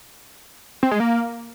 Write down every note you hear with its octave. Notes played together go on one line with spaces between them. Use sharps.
C4
G#3
A#3